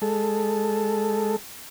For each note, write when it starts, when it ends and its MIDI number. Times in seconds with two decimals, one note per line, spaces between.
0.02 1.36 56
0.02 1.36 69